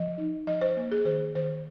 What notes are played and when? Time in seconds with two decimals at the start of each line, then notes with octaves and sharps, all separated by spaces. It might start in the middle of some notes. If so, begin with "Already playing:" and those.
Already playing: F3 D#5
0.18 D#4
0.47 F3 D#5
0.61 C5
0.77 A#3
0.92 G#4
1.05 D#3 C5
1.35 D#3 C5